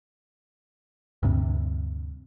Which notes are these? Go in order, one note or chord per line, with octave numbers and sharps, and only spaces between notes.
D2 G2 C3